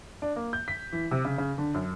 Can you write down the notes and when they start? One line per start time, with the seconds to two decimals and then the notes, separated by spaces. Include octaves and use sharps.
0.22 D4
0.36 A#3
0.53 G6
0.68 B6
0.92 E3
1.11 C3
1.25 C#3
1.38 C#3
1.58 D3
1.74 F#2